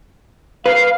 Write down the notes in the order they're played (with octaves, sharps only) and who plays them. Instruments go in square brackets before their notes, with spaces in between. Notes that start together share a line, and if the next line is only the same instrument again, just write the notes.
[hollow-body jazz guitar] B4 [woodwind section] F5